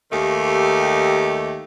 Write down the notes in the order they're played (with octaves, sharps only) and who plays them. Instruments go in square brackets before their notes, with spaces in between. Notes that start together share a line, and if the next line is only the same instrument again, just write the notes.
[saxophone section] D#2 D#3 A3 G4